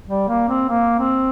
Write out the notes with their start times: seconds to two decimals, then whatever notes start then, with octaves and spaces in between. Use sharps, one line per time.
0.08 G3
0.29 A#3
0.49 C4
0.69 A#3
0.99 C4